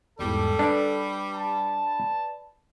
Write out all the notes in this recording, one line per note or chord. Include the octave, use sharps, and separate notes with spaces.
E2 G#2 E3 G3 A4
D4 B4 D5 B5
A5